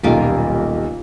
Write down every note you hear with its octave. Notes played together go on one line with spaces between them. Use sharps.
D#1 B1 G3 A#3 F4